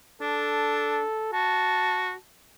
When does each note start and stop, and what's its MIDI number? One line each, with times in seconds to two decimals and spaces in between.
0.21 1.02 62
0.21 1.31 69
1.33 2.13 66
1.33 2.19 81